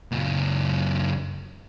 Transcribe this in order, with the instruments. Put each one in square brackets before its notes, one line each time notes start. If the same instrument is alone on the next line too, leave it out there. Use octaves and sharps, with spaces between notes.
[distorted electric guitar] C#2 F#2